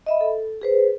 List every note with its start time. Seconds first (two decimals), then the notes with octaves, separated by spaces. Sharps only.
0.06 D#5 E5 B5
0.21 A4
0.62 G#4 B4 C5